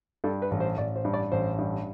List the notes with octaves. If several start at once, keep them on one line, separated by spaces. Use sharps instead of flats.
G2 A4
B4
A1
C5
A1 D5
C5
G2
D5
A1 C5
G2